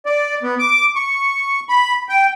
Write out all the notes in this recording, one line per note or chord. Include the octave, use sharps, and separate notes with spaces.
D5
B3
D6
C#6
B5
G5